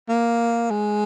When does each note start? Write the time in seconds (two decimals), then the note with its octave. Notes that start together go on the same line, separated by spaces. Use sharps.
0.09 A#3
0.71 G#3